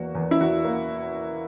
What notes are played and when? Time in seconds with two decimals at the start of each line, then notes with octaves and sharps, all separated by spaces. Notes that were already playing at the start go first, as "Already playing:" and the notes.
Already playing: E2 A#3 F#4
0.15 E2
0.31 E4
0.40 E2 F#4
0.65 A#3